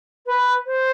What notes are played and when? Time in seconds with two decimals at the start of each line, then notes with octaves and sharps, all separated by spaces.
0.26 B4
0.66 C5